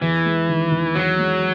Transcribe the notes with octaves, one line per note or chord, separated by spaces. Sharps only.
E2 E3
G#3
D#3
E2
E2 F#3
G#3